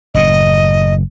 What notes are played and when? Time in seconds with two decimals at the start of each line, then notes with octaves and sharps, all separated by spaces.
0.14 F#1 A2 D#5